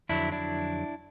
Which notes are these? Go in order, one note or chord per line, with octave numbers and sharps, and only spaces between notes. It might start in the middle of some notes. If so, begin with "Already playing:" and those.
F2 D3 F#3 D4 E4
D4 E4